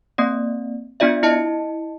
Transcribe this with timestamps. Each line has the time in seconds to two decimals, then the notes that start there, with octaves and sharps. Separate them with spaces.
0.18 A#3 C4 D5
1.00 B3 D4 F4 D5 E5
1.23 E4 D#5 A5 C#7